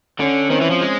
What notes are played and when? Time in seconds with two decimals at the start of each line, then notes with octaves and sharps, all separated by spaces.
0.19 D3 C#4
0.50 D#3 C4
0.61 E3
0.70 F3
0.81 G#3